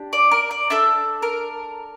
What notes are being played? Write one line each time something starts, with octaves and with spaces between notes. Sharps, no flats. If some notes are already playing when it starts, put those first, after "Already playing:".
Already playing: D4 G4
D5
A#4
D5
D4 A4 E5
A#4